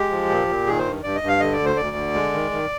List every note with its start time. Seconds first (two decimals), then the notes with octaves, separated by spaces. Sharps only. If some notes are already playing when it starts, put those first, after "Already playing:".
Already playing: G#3 G4
0.10 F3
0.29 A#2
0.48 A#2
0.66 D#3 G#4
0.79 C5
0.84 G2
1.03 G2 D5
1.16 D#5
1.22 G2
1.28 F5
1.40 D3 D#5
1.52 D5
1.59 D2
1.65 C5
1.77 D2 D5
1.96 D3
2.14 G#3
2.33 D#3
2.51 D#3